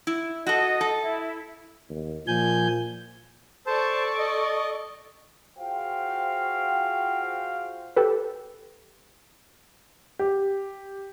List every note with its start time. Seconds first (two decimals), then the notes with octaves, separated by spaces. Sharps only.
0.07 E4
0.46 F#4 A4 D#5
0.81 A4
1.00 E4
1.90 D#2
2.27 A#2 F3 G#5 G6
3.66 A4 C5 D5 A5 C#6
4.18 D#5
5.58 F4 F#4 G#4 C5 F5 G5
7.96 G4 A4 B4
10.19 G4